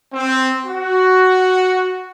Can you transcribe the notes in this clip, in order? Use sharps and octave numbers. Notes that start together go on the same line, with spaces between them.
C4
F#4